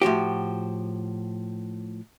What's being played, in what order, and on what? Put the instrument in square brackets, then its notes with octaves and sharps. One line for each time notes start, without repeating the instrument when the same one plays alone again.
[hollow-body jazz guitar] A2 F3 F#4 G4